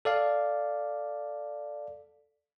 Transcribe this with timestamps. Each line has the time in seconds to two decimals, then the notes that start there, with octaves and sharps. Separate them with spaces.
0.05 A4 D5 F5